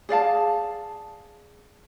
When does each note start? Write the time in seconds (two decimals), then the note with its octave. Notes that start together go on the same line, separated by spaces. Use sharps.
0.09 G#4 D5 F5 A5